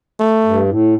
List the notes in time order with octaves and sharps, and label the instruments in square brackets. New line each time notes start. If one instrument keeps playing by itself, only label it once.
[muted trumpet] A3
[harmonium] G2
A2